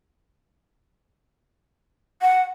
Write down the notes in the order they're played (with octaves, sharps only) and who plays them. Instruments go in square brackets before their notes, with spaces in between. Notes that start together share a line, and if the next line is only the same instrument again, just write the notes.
[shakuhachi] F#5